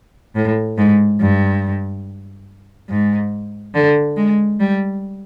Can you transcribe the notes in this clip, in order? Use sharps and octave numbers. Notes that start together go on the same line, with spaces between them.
A2
G#2
G2
G#2
D3
G#3
G3